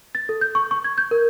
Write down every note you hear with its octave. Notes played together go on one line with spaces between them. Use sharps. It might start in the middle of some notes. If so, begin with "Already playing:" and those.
A6
A4
G6
C#6
C#6
G#6
G6
A#4